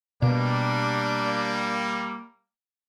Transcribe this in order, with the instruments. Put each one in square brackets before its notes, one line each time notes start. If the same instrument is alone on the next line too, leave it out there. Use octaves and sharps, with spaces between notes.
[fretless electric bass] B2 [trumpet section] G3 A#3 [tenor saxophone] D4